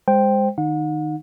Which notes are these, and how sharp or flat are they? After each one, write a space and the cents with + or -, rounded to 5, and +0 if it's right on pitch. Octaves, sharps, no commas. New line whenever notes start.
G#3 -25 C5 +0 G5 +0
D#3 -20 D#4 -15 F#5 -40